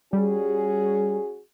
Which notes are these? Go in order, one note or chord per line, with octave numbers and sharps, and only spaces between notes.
G3 C#4 F#4 G#4